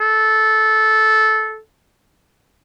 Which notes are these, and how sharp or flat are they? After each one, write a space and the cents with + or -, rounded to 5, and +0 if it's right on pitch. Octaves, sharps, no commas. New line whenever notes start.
A4 -15